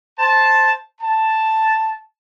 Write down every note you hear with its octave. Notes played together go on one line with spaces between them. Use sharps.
C5 A5
A5